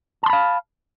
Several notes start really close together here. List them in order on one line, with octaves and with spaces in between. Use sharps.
A5 C6 B5 F5